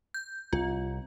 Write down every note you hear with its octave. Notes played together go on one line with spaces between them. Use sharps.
G6
C2 F4